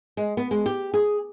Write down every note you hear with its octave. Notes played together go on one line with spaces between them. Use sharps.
G#3
B3
G#3
G4
G#4